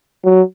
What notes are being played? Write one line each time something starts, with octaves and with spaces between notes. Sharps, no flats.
F#3